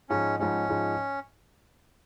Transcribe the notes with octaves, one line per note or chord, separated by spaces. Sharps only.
G#2 F3 G#3 C#4 D#4
G#2 F3 G#3 C#4 D#4
G#2 F3 G#3 D#4